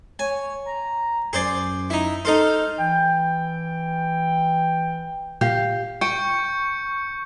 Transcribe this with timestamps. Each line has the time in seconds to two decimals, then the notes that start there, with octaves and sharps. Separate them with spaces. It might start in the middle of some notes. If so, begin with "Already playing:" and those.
0.19 C#5 G#5
0.66 A#5
1.33 F#2 G#4 C5 D5
1.90 D#4 E4
2.25 D#4 A4 C5 F6
2.79 E3 G5
5.41 A#2 G4 F5
6.01 G5 C#6 G6 C#7